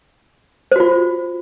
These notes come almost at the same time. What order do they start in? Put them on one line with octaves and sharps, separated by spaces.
C5 F#4 F4